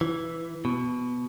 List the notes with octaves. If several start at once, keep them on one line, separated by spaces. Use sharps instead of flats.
E3
B2